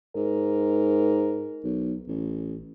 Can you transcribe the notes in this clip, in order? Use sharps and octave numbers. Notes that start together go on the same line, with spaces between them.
G#2 A#4
B1
A1